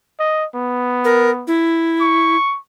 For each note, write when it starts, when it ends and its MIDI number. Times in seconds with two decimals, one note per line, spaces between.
0.20 0.46 75
0.55 1.50 59
1.05 1.30 70
1.47 2.36 64
2.01 2.58 85